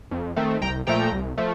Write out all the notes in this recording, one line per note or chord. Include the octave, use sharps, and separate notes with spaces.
F2
D#3 A3 C4
C2 G5 A#5
A#2 F3 A3 G5 A#5
C2
F3 A3